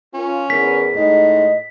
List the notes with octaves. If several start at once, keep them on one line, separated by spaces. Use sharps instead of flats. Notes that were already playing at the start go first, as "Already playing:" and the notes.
C#4 F4 A#4
E2 A#4 B6
A2 G#3 D#4 D#5